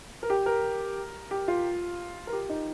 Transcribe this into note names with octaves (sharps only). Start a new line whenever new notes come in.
A#4
G4
A#4
G4
F4
A#4
G4
D#4